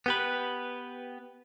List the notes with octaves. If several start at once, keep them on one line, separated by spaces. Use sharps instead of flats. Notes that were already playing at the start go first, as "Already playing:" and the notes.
B3 G4 B4